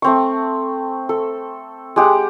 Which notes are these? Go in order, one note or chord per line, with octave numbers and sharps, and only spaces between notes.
A3 C4 C#6
A4
G#3 G4 F#5